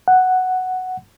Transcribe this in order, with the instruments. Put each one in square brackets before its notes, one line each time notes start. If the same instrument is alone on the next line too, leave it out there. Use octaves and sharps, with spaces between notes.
[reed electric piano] F#5